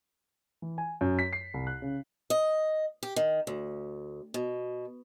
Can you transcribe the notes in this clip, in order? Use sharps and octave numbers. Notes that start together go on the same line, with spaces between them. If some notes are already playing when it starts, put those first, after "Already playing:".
E3
G#5
F#2
B6
C7
C2
F#6
C#3
D#5
G4
D#3
D2
B2